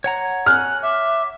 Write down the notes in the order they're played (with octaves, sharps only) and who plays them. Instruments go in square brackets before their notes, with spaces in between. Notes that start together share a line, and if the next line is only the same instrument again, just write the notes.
[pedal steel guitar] C#5 F#5 A#5
[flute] G#5 [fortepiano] F6 [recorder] F#6
[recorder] E5 [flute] D6